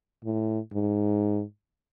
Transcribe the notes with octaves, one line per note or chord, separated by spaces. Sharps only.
A2
G#2